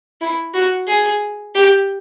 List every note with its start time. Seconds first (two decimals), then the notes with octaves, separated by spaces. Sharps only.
0.21 E4
0.54 F#4
0.87 G#4
1.55 G4